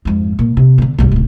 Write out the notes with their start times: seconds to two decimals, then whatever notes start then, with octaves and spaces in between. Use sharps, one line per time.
0.05 F2 G#2
0.39 A#2
0.57 C3
0.78 D3 B3
0.98 B1 G2
1.12 D1 C#3